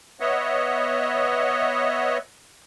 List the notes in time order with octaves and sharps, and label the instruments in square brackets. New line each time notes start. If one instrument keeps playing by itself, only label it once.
[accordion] B3 C#5 D#5 E5 F#5